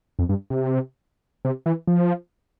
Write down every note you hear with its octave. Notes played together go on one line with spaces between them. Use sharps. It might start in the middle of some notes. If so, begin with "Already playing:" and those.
F2
G2
C3
C3
E3
F3